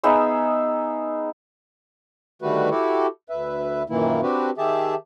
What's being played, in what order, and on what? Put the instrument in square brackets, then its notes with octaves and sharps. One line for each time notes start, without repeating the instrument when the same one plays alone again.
[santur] B3 D#4 G#4 E5
[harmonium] D3 D#3 G3 A3 F#4 B4
E4 F#4 G4 A4
D2 B4 E5
F#2 A#2 D#3 E3 A#3 E4
C4 D4 F#4 G4 B4
D#3 G4 G#4 E5 A5